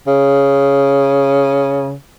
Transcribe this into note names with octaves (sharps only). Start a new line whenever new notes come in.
C#3